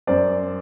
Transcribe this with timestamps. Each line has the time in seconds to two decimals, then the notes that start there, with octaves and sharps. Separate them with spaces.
0.07 F#2 C5 D5